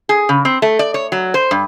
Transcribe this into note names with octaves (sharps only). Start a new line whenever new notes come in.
G#4
C#3
C4
A3
D5
C#5
F#3
C5
G2